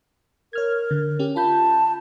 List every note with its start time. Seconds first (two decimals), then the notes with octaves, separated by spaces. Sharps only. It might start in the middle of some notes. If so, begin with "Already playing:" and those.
0.53 A#4 C#5 F6 G#6
0.91 D3
1.19 C#4 G4
1.36 F4 A5 B5 G6